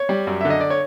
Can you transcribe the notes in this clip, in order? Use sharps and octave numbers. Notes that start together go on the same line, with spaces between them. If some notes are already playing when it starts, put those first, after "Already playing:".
Already playing: C#5
G3
F#2
D3 E5
D#5
D5
C#5